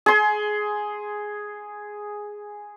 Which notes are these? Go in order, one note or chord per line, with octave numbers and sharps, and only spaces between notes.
G#4 C6